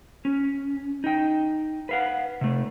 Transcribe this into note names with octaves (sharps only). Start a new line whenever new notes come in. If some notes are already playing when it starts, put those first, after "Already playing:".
C#4
D#4 G5
B4 F5 F#5
C3 A3